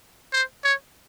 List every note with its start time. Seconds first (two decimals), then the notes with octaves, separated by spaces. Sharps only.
0.33 C5
0.64 C#5